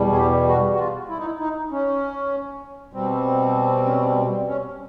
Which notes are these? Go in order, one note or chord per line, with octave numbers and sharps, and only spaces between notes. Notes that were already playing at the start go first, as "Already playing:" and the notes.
Already playing: E2 B2 G3
G#4
G4
F#4
F#4
F4
E4
D#4
E4
D#4
C#4
B2 G3 C4
C#4
C4
C#4